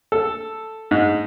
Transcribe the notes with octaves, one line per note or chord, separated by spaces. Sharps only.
A4
G#2